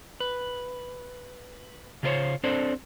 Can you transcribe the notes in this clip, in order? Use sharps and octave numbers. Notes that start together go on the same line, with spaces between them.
B4
C#3 F#3 F4 A#4 C5 C#5
C4 D4 A4 C5 D5